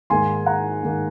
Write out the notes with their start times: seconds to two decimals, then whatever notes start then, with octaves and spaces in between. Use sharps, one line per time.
0.10 G#2 D#3 A#3 G#5 C6
0.46 F#5 A#5
0.83 G#2 D#3 A#3